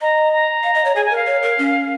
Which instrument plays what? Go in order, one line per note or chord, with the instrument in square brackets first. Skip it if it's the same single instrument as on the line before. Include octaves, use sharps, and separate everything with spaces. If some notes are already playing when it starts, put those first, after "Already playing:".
[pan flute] D#5 [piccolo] A#5
[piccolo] A#5
[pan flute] F5
D#5
C#5
[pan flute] G#4 [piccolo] G#5
[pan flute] A#4 [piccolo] G#5
[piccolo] F5
[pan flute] C#5
A#4
C#4